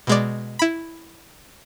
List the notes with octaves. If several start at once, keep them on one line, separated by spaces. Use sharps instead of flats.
B2 G#3 D5
E4 B5